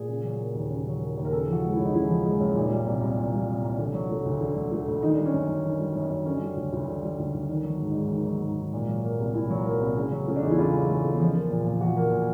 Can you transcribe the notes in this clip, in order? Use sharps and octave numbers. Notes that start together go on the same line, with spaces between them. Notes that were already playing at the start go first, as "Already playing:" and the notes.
Already playing: A#2 G#4
C#3
F#3
A#3
D#2
C#3
F#3
A#3
D#2
A#4
C#3 A4
F3
F#4
G#3
E4
F#2
D#4
C#3 E4
F3
G#3
F#2
A#2 D#4
G3
C2
C2
A#2
G3
C2
C2
D3
F#3
A3
D2
D3
F#3
A3
D2
D#3 D#4
G3 D4
C#4
F#2 D4
F#2
D#3
G3
F#2
F#2
D3 C#4
G3
D2
D2
D3
G3
D2
D2
D#3 D4
F#3
G#2
D#4
G#2
D#3
F#3
G#2
G#2
A#2
F#3
A#3
C2
A#2 E4
F#3
A#3
C2
C#3
F#3
A3 C#4
D4
E2 D#4
E4
C#3 F4
F#3
A3
E2
F3
A#3
A#2
A#2
F3 F#4
A#3
A#2